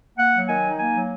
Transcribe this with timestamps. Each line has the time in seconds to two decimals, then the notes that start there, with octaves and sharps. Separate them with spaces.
0.18 A#3 F#5
0.33 F#3
0.48 D#3 G#5
0.64 D#4
0.79 A#3 G#5
0.95 F#3